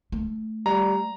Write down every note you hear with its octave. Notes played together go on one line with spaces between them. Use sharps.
A3
G3 A#5